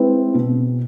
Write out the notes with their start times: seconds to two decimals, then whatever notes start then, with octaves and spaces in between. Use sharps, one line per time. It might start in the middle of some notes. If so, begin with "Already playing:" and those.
Already playing: G#3 C4 E4 B4
0.34 B2